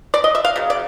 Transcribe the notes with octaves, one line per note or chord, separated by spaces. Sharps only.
D5
D#5
E5
F5
C#3 F#3
D5